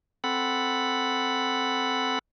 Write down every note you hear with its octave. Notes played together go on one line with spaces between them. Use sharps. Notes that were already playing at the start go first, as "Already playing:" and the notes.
C4 A4 F#5 B5